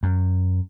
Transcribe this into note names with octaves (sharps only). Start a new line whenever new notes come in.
F#2